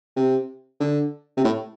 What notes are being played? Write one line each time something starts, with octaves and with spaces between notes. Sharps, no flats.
C3
D3
C3
A2